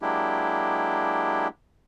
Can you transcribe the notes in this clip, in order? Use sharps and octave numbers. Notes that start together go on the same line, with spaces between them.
F#3 G#3 A#3 D4 E4 G4